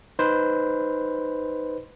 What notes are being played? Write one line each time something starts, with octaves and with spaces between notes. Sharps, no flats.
D#4 B4 C5